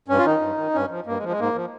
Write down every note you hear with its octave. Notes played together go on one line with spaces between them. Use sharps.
G2 C#4
F4
D#3 D#4
G2
D#3
G2 C#4
F3
G2 A#3
G#3
F3
G#3
G#2 A#3
F3